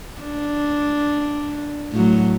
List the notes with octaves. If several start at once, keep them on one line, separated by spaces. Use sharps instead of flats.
D4
A2 F#3